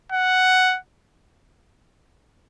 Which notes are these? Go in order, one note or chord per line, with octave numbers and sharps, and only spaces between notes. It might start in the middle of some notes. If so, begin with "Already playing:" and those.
F#5